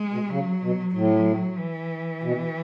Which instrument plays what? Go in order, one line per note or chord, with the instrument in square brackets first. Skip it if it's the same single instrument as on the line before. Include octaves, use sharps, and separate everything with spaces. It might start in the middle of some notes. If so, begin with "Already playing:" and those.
Already playing: [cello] G#3
[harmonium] B2
[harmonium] C#3 [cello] F#3
[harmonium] B2
[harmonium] A2 [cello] F#3
[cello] E3
[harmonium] B2